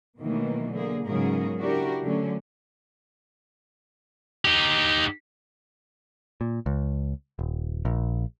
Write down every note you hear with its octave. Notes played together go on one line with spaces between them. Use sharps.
B2 D#3 E3 F#3 A3 A#3
D3 A#3 G#4
G#2 C#3 F#3 B3 G#4 A#4
D4 E4 F#4 G4 A#4
D3 F#3 A3 C#4
D#4 G4
A#2
C#2
D#1
A#1